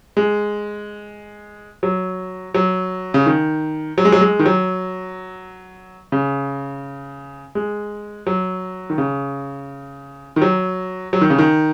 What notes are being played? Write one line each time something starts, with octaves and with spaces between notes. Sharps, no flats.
G#3
F#3
F#3
C#3
D#3
F#3
G#3
F#3
G#3
D#3
F#3
C#3
G#3
F#3
D#3
C#3
D#3
F#3
F#3
D#3
C#3
D#3